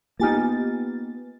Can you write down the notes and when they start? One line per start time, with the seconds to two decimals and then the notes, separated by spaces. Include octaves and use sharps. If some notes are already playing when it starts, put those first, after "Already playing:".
0.20 A#3 B3 D#4 F4 G4 G#5 F6 A6